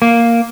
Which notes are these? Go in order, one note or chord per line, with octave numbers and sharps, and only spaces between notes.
A#3